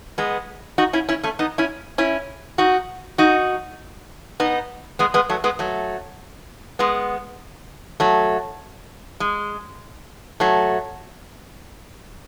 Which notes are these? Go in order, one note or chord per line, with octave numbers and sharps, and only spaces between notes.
G#3 B3
D#4 F#4
C#4 E4
C#4 E4
A3 C#4
B3 D#4
C#4 E4
C#4 E4
D#4 F#4
D#4 F#4
B3 D#4
G#3 B3
G#3 B3
F#3 A3
G#3 B3
F#3 A3
G#3 B3
F#3 A3
G#3
F#3 A3